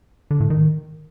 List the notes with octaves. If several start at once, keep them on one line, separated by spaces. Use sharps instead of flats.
D3
A2
D#3